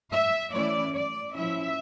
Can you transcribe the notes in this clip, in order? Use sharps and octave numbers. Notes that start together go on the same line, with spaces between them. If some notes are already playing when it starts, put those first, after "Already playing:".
E5
E3 A3 C#4 E4 D5
D5
F3 C#4 E4 E5